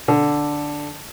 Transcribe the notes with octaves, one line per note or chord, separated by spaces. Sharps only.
D3